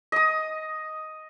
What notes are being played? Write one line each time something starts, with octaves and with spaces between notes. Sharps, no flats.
D#5 D#6